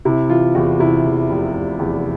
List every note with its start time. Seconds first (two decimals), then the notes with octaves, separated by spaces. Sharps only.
0.05 C3 E4
0.29 E3 F4
0.55 E2 F#4
0.80 C3 E4
1.05 E2
1.30 F1
1.55 F1
1.79 E2